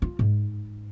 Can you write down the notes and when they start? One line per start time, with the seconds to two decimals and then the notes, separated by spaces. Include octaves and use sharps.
0.02 F4
0.19 G#2